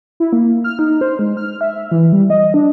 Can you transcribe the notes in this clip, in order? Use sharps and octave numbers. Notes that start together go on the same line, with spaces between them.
E4
A#3
F6
D#4
C5
G#3
F6
E5
E3
G3
D#5
D4